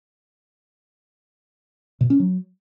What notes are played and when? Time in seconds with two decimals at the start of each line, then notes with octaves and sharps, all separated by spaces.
2.01 B2
2.10 C#4
2.20 F#3